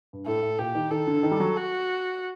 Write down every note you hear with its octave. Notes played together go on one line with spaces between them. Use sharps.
G2
A2 A4
A2
A#2 G4
D#3
D#3 A4
D3
D#3
G3
F#3
F#4